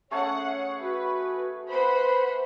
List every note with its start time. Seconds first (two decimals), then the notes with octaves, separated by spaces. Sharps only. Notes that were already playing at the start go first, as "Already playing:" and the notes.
0.11 A3 C#4 G#4 C#5 F#5
0.80 F#4 B4
1.69 B4 C5 F#5 B5